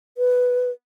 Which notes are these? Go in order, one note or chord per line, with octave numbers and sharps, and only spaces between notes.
B4